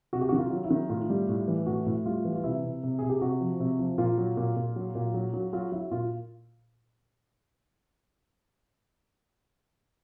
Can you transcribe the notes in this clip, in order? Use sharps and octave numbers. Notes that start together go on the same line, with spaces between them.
C3 F#4
G4
F#4
D#3
F4
F#3
E4
D#3
A2 F4
G3
A2
E3
A2 F#4
A2
G3 F4
E3
F4
C3 E4
C3
C3
C3 G#4
G4
C3 F#4
F3
C3
F3
A#2 F4
F#3
A#2
A#2
F#3
A#2
F#3
F#3
F#3 F4
F#3 E4
A#2 F4